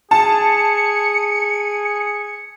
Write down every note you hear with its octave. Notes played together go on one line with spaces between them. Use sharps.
G#4 A5 C#7